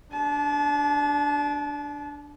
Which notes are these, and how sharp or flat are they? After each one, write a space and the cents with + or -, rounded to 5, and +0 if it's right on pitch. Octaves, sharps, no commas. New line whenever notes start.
D4 -5 A5 -35